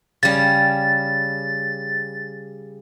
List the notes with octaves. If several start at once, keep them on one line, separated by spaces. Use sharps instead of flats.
C#3 G3 A6